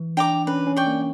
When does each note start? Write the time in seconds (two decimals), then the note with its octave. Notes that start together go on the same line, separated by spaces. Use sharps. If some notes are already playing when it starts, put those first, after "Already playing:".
Already playing: E3
0.17 D4 G5 A#5 D6
0.47 C#4 B4
0.67 C#4
0.77 D5 G5 C#6
0.87 A#3